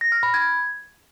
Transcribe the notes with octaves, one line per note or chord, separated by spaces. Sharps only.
A#6
F6
B5
G#6